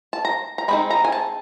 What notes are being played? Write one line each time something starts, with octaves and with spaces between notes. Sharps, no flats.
A5
A#5
A#5
G#3 C4 D#4 B5
A#5
G#5
A5